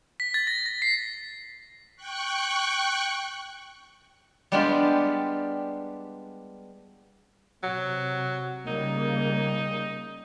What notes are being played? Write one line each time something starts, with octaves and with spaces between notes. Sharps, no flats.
B6
A6
A#6
A#6
C7
G5 C#6 F#6
G3 G#3 B3 D4 F4 G4
C3 F#3
C#3 G3 A#3 D#4